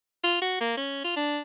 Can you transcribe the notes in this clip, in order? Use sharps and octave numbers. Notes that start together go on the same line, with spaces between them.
F4
F#4
A#3
C#4
F4
D4